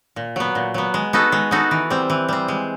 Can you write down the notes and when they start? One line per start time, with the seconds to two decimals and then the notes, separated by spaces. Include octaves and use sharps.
0.16 A#2
0.36 F#3 B3
0.55 A#2
0.74 F#3 B3
0.94 G#3
1.13 B3 D#4 F#4 A4
1.32 G#3
1.51 B3 D#4 F#4 A4
1.71 E3
1.90 G3 C4
2.10 E3
2.29 G3 C4
2.48 G#3